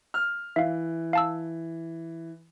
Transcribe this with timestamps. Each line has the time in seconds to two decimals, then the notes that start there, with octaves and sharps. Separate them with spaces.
0.14 F6
0.56 E3 E5 F5
1.13 F5 A5 E6